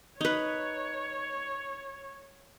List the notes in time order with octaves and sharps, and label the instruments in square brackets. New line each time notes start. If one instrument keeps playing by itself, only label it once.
[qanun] D#4 B4 [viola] C#5